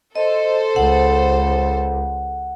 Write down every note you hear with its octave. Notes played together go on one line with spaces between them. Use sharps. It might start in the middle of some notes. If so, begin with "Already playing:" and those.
A4 C5 D#5
C#2 F#5